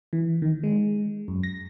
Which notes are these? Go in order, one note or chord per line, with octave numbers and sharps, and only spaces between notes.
E3
D#3
G#3
F#2
A#6